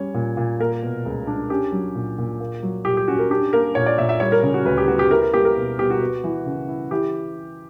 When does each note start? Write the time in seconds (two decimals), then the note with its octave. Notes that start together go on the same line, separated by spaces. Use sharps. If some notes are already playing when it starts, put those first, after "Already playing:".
Already playing: G3 C#4 C#5
0.14 A#2
0.37 A#2
0.60 A#3 A#4
0.83 B2
1.05 C#2
1.27 D4
1.50 C#4 G4
1.72 F#3
1.95 A#2
2.18 A#2
2.40 A#3
2.63 F#3
2.85 A#2 G4
2.97 G4
3.08 C#4 F#4
3.19 A#4
3.30 D4 G4
3.53 A#3 A#4
3.75 A#2 C#5
3.86 D5
3.98 A#2 E5
4.09 E5
4.20 G3 C#5
4.32 A#4
4.43 C#3
4.54 F#4
4.65 D2 B4
4.78 G4
4.88 B3 F#4
4.99 G4
5.11 E4 A#4
5.22 A#4
5.33 A#3 G4
5.45 A#4
5.56 B2
5.79 B2 G4
5.90 F#4
6.01 B3
6.24 E3
6.46 C#3
6.68 E4
6.91 E3 G4